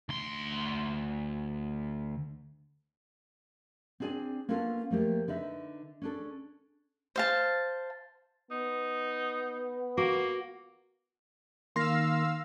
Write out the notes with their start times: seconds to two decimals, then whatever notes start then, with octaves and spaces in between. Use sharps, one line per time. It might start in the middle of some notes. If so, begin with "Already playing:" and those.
0.09 D2 C6
4.00 C4 D4 G#4 B4 D5 G#5
4.49 A#3 B3 C#4 D4 F4 A4
4.90 F3 A3 A#3 G4
5.28 D3 D#4 B4 E5
6.02 C#4 D4 A4
7.16 C5 F5 A5
8.51 B3 D#4
9.98 A#3 F#4
11.76 D#3 A#3 F5 C6 E6 A#6